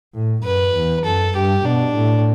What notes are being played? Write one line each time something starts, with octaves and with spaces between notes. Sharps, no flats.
A2
F#2 B4
E2
F#2 A4
G2 G4
B2 D4
A2